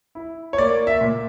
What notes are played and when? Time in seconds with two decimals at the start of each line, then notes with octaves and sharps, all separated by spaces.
0.15 E4
0.53 C#5
0.58 A#3 D5
0.87 E5
1.01 A#2